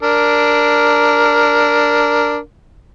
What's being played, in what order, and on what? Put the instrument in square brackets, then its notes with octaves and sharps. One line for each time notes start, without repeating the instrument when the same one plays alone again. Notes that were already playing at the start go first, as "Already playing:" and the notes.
[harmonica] D4 A#4